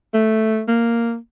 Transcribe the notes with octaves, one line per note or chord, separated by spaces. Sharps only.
A3
A#3